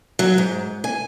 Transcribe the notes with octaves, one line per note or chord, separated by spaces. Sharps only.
F#3
G#2
G#5